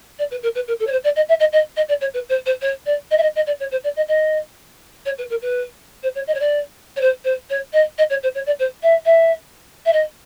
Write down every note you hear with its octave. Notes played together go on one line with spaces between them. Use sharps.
D5
B4
A#4
B4
A#4
A4
C#5
C5
D5
D#5
E5
D#5
D#5
D#5
D5
C#5
B4
C5
C5
C#5
D5
D#5
E5
D#5
D#5
D5
C#5
C5
D5
D#5
D#5
C#5
B4
A#4
B4
C5
C#5
D#5
C#5
D5
C#5
C5
C5
C#5
D#5
D#5
C#5
C5
C#5
D5
C5
E5
E5
E5
D#5